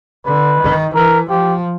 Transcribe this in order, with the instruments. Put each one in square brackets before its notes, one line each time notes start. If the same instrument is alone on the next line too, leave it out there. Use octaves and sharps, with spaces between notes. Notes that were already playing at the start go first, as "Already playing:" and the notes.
[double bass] D3 [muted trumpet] B4
[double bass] D#3
[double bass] E3 [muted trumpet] A#4
[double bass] F3 [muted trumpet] G4